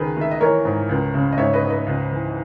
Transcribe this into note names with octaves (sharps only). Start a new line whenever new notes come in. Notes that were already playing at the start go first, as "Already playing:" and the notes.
Already playing: C#2 D#3 G#4 B4
D#3 E5
D#5
E3 A#4 C#5
G#2
C#2
C#3
D#5
G#2 C#5 E5
B4 D#5
G#2
B4 D#5
C#2
E3